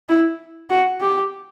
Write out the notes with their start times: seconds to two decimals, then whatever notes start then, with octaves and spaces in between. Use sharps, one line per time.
0.09 E4
0.70 F#4
1.01 G4